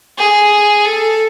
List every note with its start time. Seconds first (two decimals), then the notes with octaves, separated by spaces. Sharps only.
0.18 G#4
0.85 A4